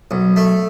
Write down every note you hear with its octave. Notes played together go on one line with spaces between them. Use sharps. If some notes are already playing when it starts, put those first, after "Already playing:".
B1
A3